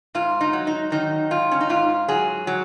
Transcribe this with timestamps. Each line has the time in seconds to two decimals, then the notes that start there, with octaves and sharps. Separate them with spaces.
0.15 G#2 F4
0.41 D#4
0.53 F#3
0.67 D#4
0.92 D#3 D#4
1.31 G#2 F4
1.51 C#4
1.61 D#4
1.70 G#2 F4
2.08 F#3 G#4
2.47 F#3